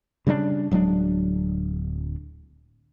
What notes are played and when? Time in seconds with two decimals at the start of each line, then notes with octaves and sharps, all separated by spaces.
0.27 C#3 G3 B3 D4
0.71 D1 F#3 G#3 D4